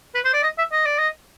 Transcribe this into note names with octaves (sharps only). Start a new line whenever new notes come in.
B4
C5
D5
D#5
E5
D#5
D5
D#5